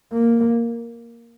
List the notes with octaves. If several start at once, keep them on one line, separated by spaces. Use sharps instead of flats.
A#3